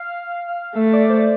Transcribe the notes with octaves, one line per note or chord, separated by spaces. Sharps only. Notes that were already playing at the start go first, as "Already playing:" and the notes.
Already playing: F5
A3 E5
D5
C5